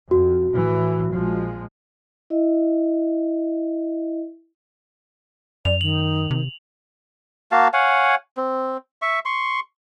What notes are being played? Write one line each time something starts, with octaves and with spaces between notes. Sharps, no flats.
F2 F#4
A2 E3
A#1 F3 G#3
E4 D#5 E5
F#2 D5 F7
D#3 F#7
C3
A#3 F#4 F5 A5
C#5 F5 F#5 G#5
C4
E5 C#6
C6 C#6